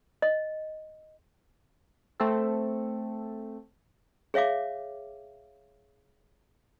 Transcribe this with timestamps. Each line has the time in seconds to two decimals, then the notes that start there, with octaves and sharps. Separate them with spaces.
0.22 D#5
2.20 A3 C4 A4
4.34 G#4 C#5 E5 F5 D6